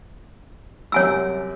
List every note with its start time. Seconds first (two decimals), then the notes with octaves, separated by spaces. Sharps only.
0.92 F#2 C3 G3 C#5 G#5 E6